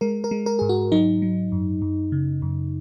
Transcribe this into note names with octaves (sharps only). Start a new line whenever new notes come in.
G#3 A#4
A#4
G#3
A#4
G#2 G#4
F#4
F#3 D#4
F#3
F#2
F#2
C#3
F#2